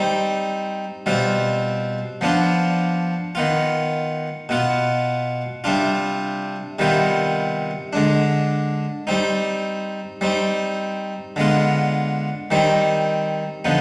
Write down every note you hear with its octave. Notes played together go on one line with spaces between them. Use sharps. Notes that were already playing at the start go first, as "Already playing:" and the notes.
Already playing: G3 C4 D#4
B2 G3 C4 F4
F3 B3 D4 F4
D#3 B3 F4
B2 B3 F4
C3 G3 D4 F4
C3 D#3 G3 B3 F4
D3 G#3 D4
G3 C4 D#4
G3 C4 D#4
D3 G#3 B3 F4
D#3 G3 C4 D#4
D3 F3 B3 D#4